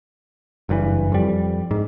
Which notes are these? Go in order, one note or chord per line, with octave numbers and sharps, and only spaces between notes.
F#1 G2 C#3 E3
F2 G3
G#2